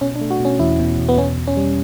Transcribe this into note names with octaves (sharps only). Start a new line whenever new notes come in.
B2 C#4
D4
A3
F#4
B2 C#4
E2 E4
B2
E2
B3
B2 C#4
B2
C#4
G3